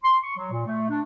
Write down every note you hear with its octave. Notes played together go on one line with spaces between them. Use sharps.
C6
C#6
F#3
A#2
A3
D4